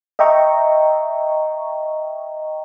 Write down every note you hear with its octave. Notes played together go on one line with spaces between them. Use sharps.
D#5 E5 G5 A#5 C#6